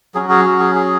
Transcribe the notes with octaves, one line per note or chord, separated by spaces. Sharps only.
F#3 C#4 F#4 G#4
G#4
F#4
G#4
G#4